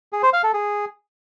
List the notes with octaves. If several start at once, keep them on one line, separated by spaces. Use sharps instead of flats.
G#4
C5
F5
A4
G#4